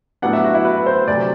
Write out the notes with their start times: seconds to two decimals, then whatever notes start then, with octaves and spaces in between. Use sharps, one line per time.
0.22 A2 F#3 B3 D4 F#5
0.33 E5
0.44 F#4
0.54 E4
0.65 B4
0.86 C5
1.08 D2 C3 F#3 D5